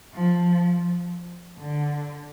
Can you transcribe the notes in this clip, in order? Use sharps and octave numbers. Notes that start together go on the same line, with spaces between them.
F3
D3